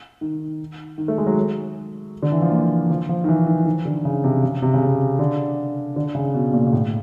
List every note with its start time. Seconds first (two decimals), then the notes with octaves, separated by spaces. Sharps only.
0.21 D#3
0.98 D#3
1.08 A3
1.18 G#3
1.27 F#3
2.23 D3
2.32 E3
2.42 F3
2.51 A#3
2.90 F3
3.09 F3
3.24 D#3
3.29 E3
3.47 D#3
3.66 D#3
3.85 D3
4.05 C#3
4.24 C3
4.43 C#3
4.62 C3
4.74 C#3
4.86 C3
5.19 D3
5.96 D3
6.15 C#3
6.34 B2
6.53 A#2
6.67 A#2
6.73 A2